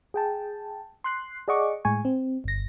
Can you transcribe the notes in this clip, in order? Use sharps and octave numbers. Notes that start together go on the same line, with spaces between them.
G#4 G5 A5
C6 F#6 C7
G#4 D5 D#5 F#5 C#6 D6
A2 G#3 G#5 C#6
C4
G1 A#6